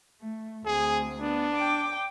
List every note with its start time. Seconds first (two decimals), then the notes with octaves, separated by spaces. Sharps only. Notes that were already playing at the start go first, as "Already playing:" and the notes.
0.21 A3
0.65 D2 C4 G#4
1.20 B3 D4
1.54 G5 D6